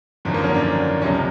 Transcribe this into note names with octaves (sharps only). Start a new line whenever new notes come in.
G#1 F#2 D3 F3
A#3
C#4
D4
C#2 C3 F3 C#4